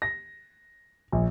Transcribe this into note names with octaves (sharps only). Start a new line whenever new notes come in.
A#6
A#1